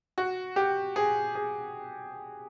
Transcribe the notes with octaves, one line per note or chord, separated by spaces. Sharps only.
F#4
G4
G#4
G#4